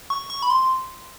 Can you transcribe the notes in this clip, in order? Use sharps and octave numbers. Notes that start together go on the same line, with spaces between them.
C#6
C#6
B5
C6